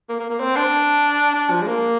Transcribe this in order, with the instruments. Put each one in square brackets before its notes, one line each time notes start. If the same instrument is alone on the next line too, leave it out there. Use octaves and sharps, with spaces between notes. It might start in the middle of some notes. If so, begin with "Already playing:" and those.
[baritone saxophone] A#3
A#3
A#3
C4
D4
D4
F3
G#3
A#3